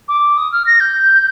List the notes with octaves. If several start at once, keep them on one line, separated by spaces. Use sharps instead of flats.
D6
D#6
F6
A#6
G6